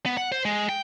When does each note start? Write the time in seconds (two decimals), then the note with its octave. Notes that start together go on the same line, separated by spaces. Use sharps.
0.06 B3
0.17 F#5
0.32 C5
0.45 G#3
0.69 G5